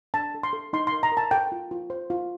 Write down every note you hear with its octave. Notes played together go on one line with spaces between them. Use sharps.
D4 A5
A4
C6
A4
D#4 C6
A#4 C6
A#5
A#4
A5
A4 G5
F4
F4
C5
F4